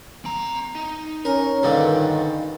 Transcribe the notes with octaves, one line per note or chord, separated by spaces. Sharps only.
C4 A#5
D#4
C#4 A#4
G2 A#2 D3 D#3